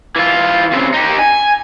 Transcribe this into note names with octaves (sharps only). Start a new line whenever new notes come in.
E3 F4
C#3 C4
D#4 G4
G#5